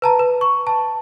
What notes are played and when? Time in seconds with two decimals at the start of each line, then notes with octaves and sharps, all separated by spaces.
0.02 B4 A5 A#5
0.19 B4
0.41 C#6
0.67 A5